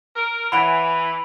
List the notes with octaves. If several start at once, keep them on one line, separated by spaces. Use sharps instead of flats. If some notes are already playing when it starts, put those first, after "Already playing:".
A#4
E3 C#5 F#5 G#5 B5 D7 F7